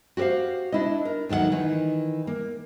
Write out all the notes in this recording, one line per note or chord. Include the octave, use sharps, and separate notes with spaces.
F#4 G4 A#4 C5 F5
D4 E4 D#5
A#4
D2 D#3 F#3 D5 F#5
D#3 E3
A#3